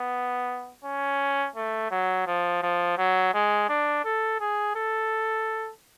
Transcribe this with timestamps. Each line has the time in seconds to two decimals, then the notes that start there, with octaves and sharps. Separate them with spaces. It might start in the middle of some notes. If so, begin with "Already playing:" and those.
Already playing: B3
0.84 C#4
1.55 A3
1.91 F#3
2.27 F3
2.62 F3
2.98 F#3
3.34 G#3
3.69 D4
4.05 A4
4.40 G#4
4.75 A4